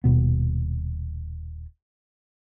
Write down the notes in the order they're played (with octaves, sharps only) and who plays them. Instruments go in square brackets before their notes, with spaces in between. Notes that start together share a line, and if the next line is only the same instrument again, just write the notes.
[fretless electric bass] D#1 B2 B3